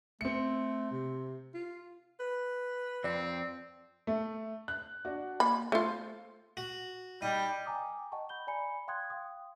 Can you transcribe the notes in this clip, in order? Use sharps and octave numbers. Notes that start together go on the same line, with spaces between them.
A3 C4 C#7
C3
F4
B4
F2 C4 D5
A3
F#6
D4 F#4
A#3 B5
A3 F4 C5
F#4
G3 D#4 G5
G5 G#5 A#5 D6 D#6
D#5 F#5 G5 A5 C#6
B5 G6 G7
D5 G#5 A#5 B5 C#7
F5 G5 C6 D#6 F#6 G#6
F5 G5 D#6